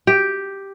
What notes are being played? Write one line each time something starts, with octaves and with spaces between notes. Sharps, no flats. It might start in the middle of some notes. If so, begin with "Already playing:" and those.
G4